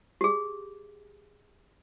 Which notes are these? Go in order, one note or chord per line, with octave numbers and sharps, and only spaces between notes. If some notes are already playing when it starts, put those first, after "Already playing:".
G4 G#4